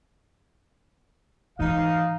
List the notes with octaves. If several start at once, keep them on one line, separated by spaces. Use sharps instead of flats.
G#2 E3 D#4 F5